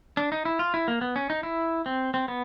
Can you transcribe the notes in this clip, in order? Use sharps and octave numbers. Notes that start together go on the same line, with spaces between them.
D4
D#4
E4
F4
E4
A#3
B3
C#4
D#4
E4
C4
C4
B3